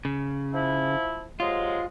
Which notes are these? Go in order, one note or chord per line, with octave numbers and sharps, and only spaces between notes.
C#3
F3 E4
C3 F#3 G#3 F4